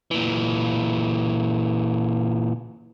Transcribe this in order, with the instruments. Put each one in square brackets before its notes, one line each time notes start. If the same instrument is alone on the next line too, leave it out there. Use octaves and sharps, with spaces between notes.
[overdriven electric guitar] A#2 E3